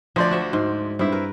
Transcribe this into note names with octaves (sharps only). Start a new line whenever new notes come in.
D2 F3 C5 D5
F#4 E5 F#5
G#2
G2 C4 E4
A#4 B4